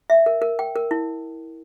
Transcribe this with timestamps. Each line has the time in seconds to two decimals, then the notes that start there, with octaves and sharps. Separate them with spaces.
0.10 E5
0.26 A#4
0.42 A#4
0.59 G5
0.76 A#4
0.91 E4